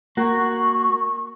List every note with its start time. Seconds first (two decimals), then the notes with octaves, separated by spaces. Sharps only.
0.17 A#3 F#4 C#6